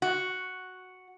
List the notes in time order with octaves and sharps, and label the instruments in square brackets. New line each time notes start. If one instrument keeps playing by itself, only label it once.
[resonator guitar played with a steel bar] F#4